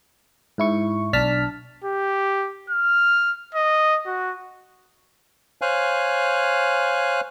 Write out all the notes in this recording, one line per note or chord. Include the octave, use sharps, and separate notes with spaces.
G#2 E4 C#6
B1 D4 A5 F6 B6
G4
F6
D#5
F#4
C5 C#5 F5 G#5 F#6